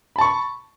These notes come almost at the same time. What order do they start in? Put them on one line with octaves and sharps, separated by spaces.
B5 A5 C#6